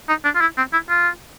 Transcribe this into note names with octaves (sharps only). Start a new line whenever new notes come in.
D#4
D4
F4
E4
C4
E4
F4